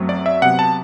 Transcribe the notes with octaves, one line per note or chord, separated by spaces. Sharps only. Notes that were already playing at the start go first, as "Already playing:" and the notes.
Already playing: F#2 F#3 A3 C4
D5
E5
C3 F#3 B3 F#5
A5